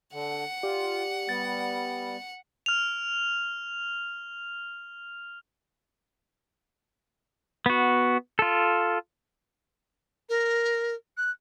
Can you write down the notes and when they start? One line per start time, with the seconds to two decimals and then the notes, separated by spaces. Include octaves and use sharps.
0.13 D3 F#5
0.63 F4 G4 D5
1.29 G3 B3 A6
2.66 F6 F7
7.66 B3 F#4
8.39 F4 A4
10.29 A#4
11.17 F#6